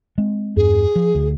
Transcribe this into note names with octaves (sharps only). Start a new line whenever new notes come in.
G#3 C4
E2 G2 G#4
F3
D2